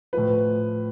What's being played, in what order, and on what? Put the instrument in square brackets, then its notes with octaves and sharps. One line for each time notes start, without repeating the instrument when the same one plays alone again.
[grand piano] A2 F3 B4